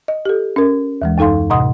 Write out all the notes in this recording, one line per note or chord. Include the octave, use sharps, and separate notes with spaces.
D#5
G4 A4
C#4 A#4
D#2 E3 G#3
F#2 D#4 A4 F5 C6
A2 C3 D#5 F#5 C6 D#6